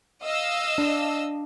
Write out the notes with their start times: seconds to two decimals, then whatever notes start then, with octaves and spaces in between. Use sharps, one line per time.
0.23 D#5 F5 E6
0.78 D4